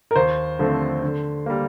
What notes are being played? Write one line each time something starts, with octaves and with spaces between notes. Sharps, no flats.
A#4
D#2 C5
D3 F3 A3 C4
D3
G3 A#3